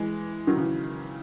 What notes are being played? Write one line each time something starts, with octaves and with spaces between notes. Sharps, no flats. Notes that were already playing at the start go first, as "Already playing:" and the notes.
Already playing: E3 G#3
D#3 F#3
C#3 E3